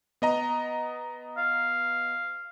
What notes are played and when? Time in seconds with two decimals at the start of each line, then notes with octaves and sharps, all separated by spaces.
0.22 B3 D#5 A#5
1.37 F5